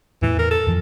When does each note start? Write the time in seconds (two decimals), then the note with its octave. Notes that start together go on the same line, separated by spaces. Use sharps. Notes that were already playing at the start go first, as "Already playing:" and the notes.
0.22 E2 A2 E3
0.39 A#4
0.51 A4
0.67 F2 E3 F3